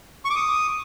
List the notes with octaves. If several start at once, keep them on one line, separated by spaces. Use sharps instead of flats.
C#6
D6
D#6